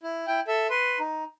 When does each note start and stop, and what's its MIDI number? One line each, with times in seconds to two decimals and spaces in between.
0.03 0.27 64
0.27 0.40 64
0.27 0.40 79
0.48 0.67 69
0.48 0.67 76
0.70 0.99 71
0.70 0.99 84
1.00 1.24 63